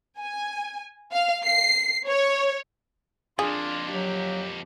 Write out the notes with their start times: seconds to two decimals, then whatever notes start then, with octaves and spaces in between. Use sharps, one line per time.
0.19 G#5
1.13 F5
1.44 C7
2.08 C#5
3.39 F2 A#3 D4 F4 G#4
3.90 F#3 G4